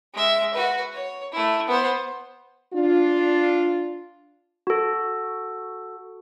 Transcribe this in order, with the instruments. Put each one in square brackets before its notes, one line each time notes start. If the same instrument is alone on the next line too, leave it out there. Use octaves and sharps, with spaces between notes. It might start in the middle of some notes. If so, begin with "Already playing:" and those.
[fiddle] G#3 E5
F#4 B4
C#5
A3 E4
B3 C5
[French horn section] D4 F4
[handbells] F#4 A4